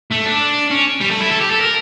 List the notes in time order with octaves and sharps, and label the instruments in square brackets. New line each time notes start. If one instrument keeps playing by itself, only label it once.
[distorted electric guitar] A3
D4
C#4
G3
A3
E4
A4
G4
A4
A#4